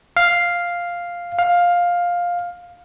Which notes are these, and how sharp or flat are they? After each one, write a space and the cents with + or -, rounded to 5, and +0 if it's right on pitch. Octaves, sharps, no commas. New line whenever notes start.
F5 +0
F5 +10